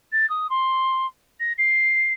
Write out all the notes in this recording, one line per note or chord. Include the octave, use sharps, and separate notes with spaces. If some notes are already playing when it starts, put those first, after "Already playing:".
A6
D#6
C6
A#6
C7